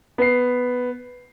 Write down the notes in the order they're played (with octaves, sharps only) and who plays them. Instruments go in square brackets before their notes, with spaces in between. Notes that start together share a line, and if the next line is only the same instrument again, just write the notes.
[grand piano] B3 C7